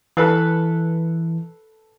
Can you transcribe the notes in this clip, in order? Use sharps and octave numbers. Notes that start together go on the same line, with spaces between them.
E3 A4 B4 F5